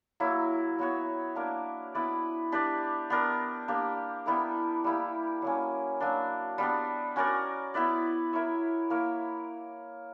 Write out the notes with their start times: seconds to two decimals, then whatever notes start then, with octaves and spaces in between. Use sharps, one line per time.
0.20 F#3 A#3 E4
0.78 F#3 B3 F#4 C#5
1.36 A#3 D4 A#4 D5
1.94 B3 E4 B4 D5
2.52 D4 G4 B4 D5
3.10 B3 D4 A#4
3.68 A#3 D4 G4
4.26 G3 B3 E4 A#4
4.84 G3 A#3 E4 G4
5.42 F#3 A#3 C#4
6.00 F#3 A#3 D4
6.58 G3 B3 D4
7.16 C#4 F#4 A#4 D5
7.74 B3 E4 B4 D5
8.33 E4 A#4 C#5 E5
8.90 A#3 E4 A#4 C#5